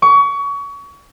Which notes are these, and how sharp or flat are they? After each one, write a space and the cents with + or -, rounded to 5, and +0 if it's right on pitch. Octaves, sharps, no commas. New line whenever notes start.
C#6 +30